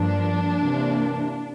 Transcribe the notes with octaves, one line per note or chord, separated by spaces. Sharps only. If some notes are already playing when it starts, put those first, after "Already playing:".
Already playing: G2 F3 A#3 D4
C3 E3 A#3